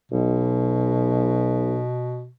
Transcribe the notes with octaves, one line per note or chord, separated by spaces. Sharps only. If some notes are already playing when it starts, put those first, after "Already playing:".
B1 B2